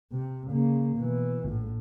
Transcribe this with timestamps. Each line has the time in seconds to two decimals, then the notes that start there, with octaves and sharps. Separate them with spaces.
0.12 C3
0.51 C#3 A#3
0.97 B2 E3
1.45 A#1 A2